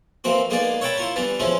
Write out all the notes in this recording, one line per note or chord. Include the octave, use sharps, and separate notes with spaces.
E3 A#3 C4 F#4
G#3 A#3 B3 D#4 G#4 D5
C#5 E5 F#5 G5 A5 B5
E4 F4 A#4
E3 G3 B3 D4
E3 F3 G#3 C#4 E4